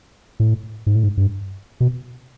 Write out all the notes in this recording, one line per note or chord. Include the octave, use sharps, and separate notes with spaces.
A2
G#2
A2
G#2
G2
B2